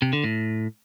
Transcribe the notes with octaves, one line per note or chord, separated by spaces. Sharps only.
C3
D3
A2